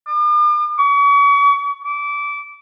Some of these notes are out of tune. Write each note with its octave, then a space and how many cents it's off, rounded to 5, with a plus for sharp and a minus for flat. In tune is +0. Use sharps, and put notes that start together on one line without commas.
D6 +45
C#6 +40
D6 -20